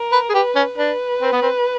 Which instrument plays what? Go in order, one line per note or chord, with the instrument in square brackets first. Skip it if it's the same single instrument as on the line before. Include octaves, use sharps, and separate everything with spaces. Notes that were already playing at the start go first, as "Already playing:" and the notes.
Already playing: [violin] A#4
[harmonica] B4
G#4
[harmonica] G4 [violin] B4
[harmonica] C#4
[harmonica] D4 [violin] B4
[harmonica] C4
B3
C4